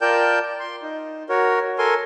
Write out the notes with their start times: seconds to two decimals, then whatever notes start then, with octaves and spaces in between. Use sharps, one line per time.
0.01 F4 A#4 D5 G5 A5 G6
0.60 C6
0.83 D#4
1.29 F#4 A#4 C#5
1.78 A4 A#4 G#5 C6